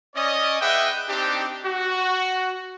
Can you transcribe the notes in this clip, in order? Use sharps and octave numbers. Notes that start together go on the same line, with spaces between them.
C#4 D5 D#5
G#4 B4 D#5 E5 F#5 G5
C4 D4 D#4 G4
F#4